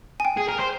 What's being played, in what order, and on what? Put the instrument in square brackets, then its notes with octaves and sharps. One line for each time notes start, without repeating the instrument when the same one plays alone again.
[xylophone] G#5
G5
[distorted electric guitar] G#4
A#4
C5